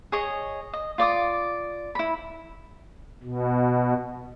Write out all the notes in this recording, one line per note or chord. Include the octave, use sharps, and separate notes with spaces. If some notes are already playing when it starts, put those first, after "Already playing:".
G#4 C#5 D#5
D#5
F4 D5 D6 D#6
E4 B5
B2